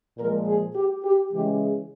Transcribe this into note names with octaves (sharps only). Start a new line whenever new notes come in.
A#2 F3 G#3 A#4
G#4
G4
G4
C#3 E3 G#3 G4
G#4